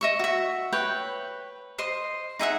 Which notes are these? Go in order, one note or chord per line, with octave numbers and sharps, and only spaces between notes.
D#5 E5 C#6
F#4 E5
B4 C#5 G5
C5 D#5 C6
D#4 G#4 E5 F#5